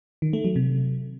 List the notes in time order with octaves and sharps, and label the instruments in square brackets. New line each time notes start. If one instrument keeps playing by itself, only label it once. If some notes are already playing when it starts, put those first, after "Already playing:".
[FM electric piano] D#3
A3
F#3
C3